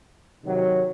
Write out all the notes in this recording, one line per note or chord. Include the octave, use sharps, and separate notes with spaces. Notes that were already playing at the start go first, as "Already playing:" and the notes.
C3 D#3 F#3